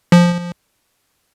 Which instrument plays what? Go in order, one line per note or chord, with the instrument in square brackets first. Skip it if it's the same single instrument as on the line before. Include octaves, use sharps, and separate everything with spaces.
[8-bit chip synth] F3